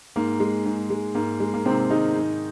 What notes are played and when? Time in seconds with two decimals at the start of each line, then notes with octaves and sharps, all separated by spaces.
0.16 G#2 A#3
0.40 G#3
0.66 G#2
0.90 G#3
1.15 G#2 A#3
1.40 G#3
1.54 A#3
1.65 G#2 C3 C4
1.90 D#3 G#3 D#4
2.16 G#2